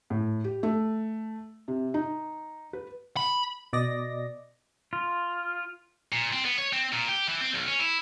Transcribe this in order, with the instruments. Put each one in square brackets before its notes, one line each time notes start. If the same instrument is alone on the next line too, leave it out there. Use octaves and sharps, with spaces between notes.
[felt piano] A2
G4
A3
C3
D#4
B4
[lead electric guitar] B5
[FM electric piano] B2 D5 D#5 A#6
[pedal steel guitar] F4
[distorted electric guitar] A#2
C4
B3
C#5
C4
A#2
G4
E3
C4
B1
C#4
E4